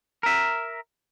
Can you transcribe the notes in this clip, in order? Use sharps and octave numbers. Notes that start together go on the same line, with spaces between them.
A#4 E5